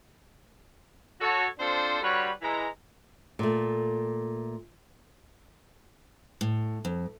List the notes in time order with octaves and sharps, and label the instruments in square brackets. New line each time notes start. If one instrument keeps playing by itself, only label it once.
[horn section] F#4 A4 C#5
C4 D4 F4 A4 C5
D3 G3 F#4 B4 C#5
E3 G#3 A#5
[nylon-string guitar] A#2 A3
[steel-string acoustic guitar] A2
F2